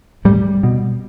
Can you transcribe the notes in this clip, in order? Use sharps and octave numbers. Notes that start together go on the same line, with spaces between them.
A2 G3
B2